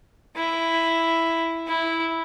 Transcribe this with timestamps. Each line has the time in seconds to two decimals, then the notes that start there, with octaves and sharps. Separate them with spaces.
0.36 E4
1.68 E4